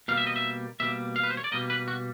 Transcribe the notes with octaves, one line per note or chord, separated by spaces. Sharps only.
B2 G3 A#3 F5
E5
D#5
E5
B2 G3 A#3 E5
F5
B4
C5
C#5
D5
B2 G3 A#3 D#5
B4
F#4